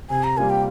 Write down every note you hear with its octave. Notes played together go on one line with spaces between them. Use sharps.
C3 G#5
A#5
G3 A#3 F4 A#4 G#5
G5